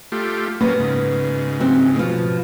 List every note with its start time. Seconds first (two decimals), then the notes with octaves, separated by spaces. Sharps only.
0.12 A3 F4 G4
0.61 F#3 A#3 B3 C#4
0.80 G#2 C#3
1.60 F#3 C4
1.96 B2 F3